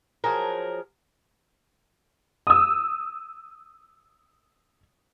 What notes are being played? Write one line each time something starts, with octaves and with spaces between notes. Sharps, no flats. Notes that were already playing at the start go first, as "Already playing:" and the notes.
F3 F#3 G#4 A#4
D#6 E6